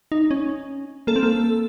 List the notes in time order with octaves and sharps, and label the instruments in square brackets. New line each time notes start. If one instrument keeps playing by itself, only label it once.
[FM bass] D#4
C#4
[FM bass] A#3 [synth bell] A4
[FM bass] C4
A#3